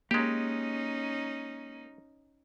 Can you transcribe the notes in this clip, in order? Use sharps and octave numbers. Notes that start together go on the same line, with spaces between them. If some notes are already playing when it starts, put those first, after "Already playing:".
G#3 A#3 C#4 D#4 G4